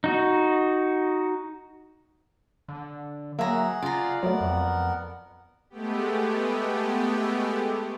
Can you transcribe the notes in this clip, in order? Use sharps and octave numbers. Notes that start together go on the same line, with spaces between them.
D#4 F#4
D3
F#3 A#3 G#4 E5 F#5 A#5
C#3 F4 D5 A#5
F#3 A3 B3 A#4 F#5
F2
G#3 A3 B3 G4